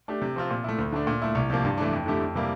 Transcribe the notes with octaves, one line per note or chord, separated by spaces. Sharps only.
A3 D4 G4
C3
F3 C4 F4
A#2
A3 E4
D2
D3 A3 D4
A#2
A3 E4
C2
C3 F3 A#3
G2
E3 A3 D4
F2
D3 A3 E4 G4
F2
C3 G3 A#3 E4